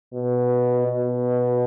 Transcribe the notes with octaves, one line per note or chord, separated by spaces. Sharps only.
B2
B2